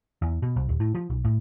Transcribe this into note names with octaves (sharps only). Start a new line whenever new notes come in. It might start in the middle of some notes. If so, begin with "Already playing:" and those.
E2
B2
C2
D#1
A2
F3
B1
A2